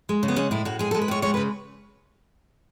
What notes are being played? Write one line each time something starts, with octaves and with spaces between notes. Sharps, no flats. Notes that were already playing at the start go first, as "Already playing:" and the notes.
G#3
C#3
B3
G#3 C#4
A2 E4
A2 F#4
G#3 G#4
A4
G#3
B4
A2 C#5
G#3 C#5
B4
C#3